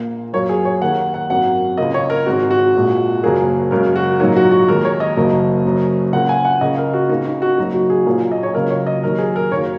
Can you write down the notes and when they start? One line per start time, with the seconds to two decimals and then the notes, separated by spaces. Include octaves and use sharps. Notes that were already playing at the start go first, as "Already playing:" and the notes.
Already playing: A#1 A#2 A#3
0.33 F#2 F#3 A#3 C#5
0.49 G#4
0.65 C#5
0.81 D#2 D#3 A#3 F#5
1.14 F#5
1.29 G#1 F#2 F#3 A#3 F#5
1.77 C#2 C#3 A#3 D#5
1.94 C#5
2.10 A#4
2.26 G#1 G#2 G#3 F#4
2.51 F#4
2.74 A#1 A#2 G#3
3.23 F#1 F#2 F#3 A#3 G#4
3.71 F#2 C#3 G#3 A#4
3.96 F#4
4.19 A#1 G#2 F#3 A#3 D#4
4.36 F#4
4.51 F#4
4.68 D#2 D#3 G#3 A#4
4.85 C#5
5.00 D#5
5.16 F#1 F#2 F#3 A#3
5.64 F#1 F#2 F#3
6.12 C#2 C#3 A#3 F#5
6.29 G#5
6.45 F#5
6.61 C#2 C#3 A#3 D#5
6.78 A#4
6.93 F#4
7.09 C#2 C#3 A#3 D#4
7.25 D#4
7.42 F#4
7.58 F#1 F#2 F#3 D#4
7.74 F#4
7.90 G#4
8.06 A#1 A#2 F#3 A#3
8.32 D#5
8.43 C#5
8.54 C#2 C#3 F#3 A#3 A#4
8.70 C#5
8.87 D#5
9.03 D#2 D#3 F#3 A#4
9.18 G#4
9.36 A#4
9.51 F#2 D#3 A#3 C#5